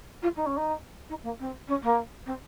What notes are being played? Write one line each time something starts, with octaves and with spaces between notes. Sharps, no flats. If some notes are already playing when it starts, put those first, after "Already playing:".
F4
D#4
C#4
D#4
D#4
A#3
C4
C#4
A#3
C4